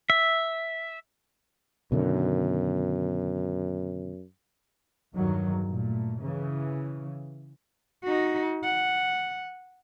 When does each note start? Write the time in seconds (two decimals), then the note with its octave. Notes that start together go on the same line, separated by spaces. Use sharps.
0.10 E5
1.92 F#2 B2 D3 D#3
5.14 E2 G2 D#3 F#3
5.67 A#2 A3
6.20 C#3 E3
8.04 D#4 F#4
8.64 F#5